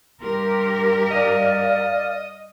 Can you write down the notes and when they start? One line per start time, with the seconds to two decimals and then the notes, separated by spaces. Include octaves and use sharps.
0.22 G2 G4 A#4 C6
1.11 D5 D#5 F5 F6